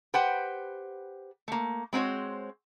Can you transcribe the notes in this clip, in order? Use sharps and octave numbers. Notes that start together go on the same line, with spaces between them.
G4 B4 C5 F#5 G5
A3 A#3
G#3 C4 F#4 C5 C#5